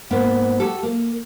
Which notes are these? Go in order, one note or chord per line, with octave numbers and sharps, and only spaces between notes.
G#2 A#3 B3
F#4 G4 A4
A#3